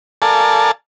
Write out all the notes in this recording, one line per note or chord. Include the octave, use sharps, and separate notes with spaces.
A4 A#4 D5 F5 G#5 A5